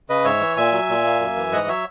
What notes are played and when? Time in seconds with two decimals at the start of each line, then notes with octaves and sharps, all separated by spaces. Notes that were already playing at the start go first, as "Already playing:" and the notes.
0.09 C#3 B4 D#5
0.24 G#2 C#5 E5
0.41 E3
0.57 A#2 E5 G#5
0.72 F#3
0.89 A#2
1.05 A#3
1.20 F#2
1.37 E3
1.52 G#2 D#5 F#5
1.68 F#3 C#5 E5